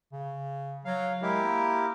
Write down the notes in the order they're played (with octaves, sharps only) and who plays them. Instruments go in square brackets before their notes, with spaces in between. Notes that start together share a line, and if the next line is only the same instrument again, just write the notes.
[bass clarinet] C#3
[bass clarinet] F#3 [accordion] F5
[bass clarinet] G#3 [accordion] E4 G4 A#4
[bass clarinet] A#3